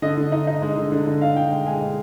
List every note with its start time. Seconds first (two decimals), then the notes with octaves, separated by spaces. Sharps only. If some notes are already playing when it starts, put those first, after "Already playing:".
0.02 D3 D#5
0.17 D3
0.32 D#4
0.47 D#4
0.62 G#3
0.77 D3
0.92 D3
1.07 D3
1.21 D#4 F5
1.36 D3 G5
1.51 G#3 G5
1.66 G#3 G#5
1.81 G#3